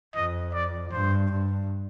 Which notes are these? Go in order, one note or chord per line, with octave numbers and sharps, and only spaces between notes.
F2 D#5
D5
G2 C5
G2